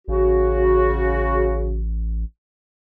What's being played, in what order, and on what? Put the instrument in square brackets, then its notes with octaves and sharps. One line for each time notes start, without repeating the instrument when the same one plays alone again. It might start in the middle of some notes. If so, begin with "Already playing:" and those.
[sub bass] A1 [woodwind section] C#3 F#4